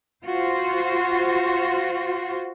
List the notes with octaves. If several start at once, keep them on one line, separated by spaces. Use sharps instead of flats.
F4 F#4 C5